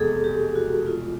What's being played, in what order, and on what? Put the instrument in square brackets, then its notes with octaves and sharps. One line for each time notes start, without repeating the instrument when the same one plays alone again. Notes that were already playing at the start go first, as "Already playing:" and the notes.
Already playing: [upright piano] F1 E2 B2 G#3 [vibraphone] G#4 A4
[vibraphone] G4
F#4
F4